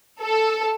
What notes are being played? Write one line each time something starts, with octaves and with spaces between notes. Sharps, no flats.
A4